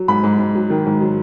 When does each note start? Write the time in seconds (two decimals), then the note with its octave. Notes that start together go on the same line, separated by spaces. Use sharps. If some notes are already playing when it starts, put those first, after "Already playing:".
Already playing: F#3
0.08 G#2 B5
0.23 G#2
0.38 G#2
0.55 F#3
0.70 D#3
0.86 G#2
1.01 F#3